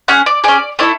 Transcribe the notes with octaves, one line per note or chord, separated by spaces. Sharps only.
C#4 G#4 F#5
D5
C#4 G#4 D5
A3 E4 A4 D5